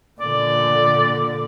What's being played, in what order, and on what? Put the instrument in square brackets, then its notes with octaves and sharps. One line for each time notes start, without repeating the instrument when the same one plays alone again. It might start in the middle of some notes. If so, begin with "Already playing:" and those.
[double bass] A#2 D3 [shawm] D5